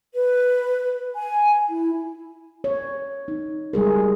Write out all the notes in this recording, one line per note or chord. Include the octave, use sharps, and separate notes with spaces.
B4
G#5
E4
C#5
D#4
G3 G#3 G#4 A#4